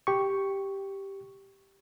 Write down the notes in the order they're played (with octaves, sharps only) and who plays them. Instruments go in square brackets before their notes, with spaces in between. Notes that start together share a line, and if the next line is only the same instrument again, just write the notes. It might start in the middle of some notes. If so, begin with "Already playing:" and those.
[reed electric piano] G4 C#6